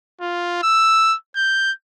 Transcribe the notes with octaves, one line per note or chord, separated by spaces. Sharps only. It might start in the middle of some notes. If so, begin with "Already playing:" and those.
F4
E6
G6